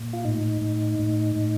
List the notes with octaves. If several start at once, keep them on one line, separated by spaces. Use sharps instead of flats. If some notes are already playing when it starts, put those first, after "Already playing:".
Already playing: A#2
F4
A2 D#4
A2
A2
A2